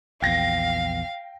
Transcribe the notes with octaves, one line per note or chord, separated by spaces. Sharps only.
A#1 E2 F5 G5 A#6